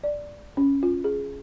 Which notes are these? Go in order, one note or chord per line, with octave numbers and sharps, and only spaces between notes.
D5
C#4
F4
G#4